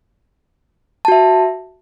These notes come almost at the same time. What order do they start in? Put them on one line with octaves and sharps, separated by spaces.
A5 F#4 E5